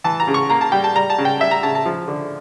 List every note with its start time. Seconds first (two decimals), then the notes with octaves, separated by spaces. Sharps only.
0.04 E3 A5
0.20 A#5
0.28 C#3
0.34 C#6
0.50 A#3 A#5
0.61 A5
0.72 G3 G5
0.84 A5
0.95 G3 A#5
1.10 A5
1.18 C#3
1.25 G5
1.40 G3 E5
1.51 A#5
1.63 C#3 A5
1.75 A5
1.86 F3
2.08 D3